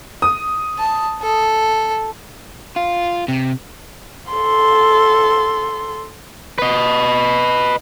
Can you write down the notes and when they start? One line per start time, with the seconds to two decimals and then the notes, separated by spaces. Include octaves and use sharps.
0.22 D#6
0.78 A5
1.22 A4
2.76 F4
3.28 C3
4.32 A4 C6
6.58 B4 D#5